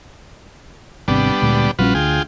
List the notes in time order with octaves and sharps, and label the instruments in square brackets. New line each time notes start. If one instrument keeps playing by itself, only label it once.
[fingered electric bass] G#1 C3 [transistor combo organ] G3 B3 D4
[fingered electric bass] D2 A#2 G#3
[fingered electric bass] A#1 G3 C#4 [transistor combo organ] F4 F#4 B4
[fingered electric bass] D2 [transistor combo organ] F4 G#4 G5